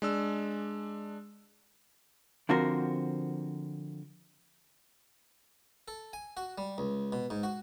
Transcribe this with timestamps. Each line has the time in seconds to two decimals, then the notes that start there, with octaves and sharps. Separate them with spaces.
0.02 G#3 D4 E6
2.49 D3 F3 C4 F#4 A#4
5.88 A4
6.13 G#5
6.37 F#4
6.58 G3
6.78 C#2
7.12 B2
7.30 G#2
7.43 F#4